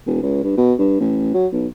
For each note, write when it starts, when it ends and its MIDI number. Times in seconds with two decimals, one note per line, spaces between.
0.06 0.21 28
0.22 0.42 37
0.44 0.55 43
0.57 0.73 47
0.79 0.98 43
1.00 1.31 33
1.34 1.46 54
1.52 1.67 35